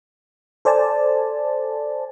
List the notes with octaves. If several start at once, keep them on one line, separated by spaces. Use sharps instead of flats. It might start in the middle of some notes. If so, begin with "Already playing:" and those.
A4 C5 D5 G#5 A5